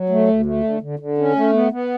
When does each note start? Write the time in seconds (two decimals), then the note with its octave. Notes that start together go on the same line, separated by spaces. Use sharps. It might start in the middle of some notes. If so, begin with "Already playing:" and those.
Already playing: F#3
0.10 A3
0.28 D2
0.45 A3
0.64 D3
0.81 D3
0.99 D3
1.18 C#4
1.36 A3
1.53 B3
1.72 B3